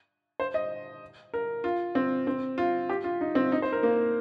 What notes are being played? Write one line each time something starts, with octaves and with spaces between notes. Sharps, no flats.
C5
D#5
A#4
F4
C4
C4
F4
G4
F4
D#4
C4
D#4
C5
A#4
A#3